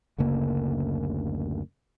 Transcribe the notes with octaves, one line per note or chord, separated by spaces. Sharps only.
F#1 D2 C#3 A#3